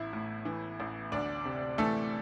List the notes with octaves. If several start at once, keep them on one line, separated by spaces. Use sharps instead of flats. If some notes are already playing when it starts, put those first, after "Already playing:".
Already playing: A1 E4 E5
A2
E3
A1
D2 D4 D5
C3
E3 A3 A4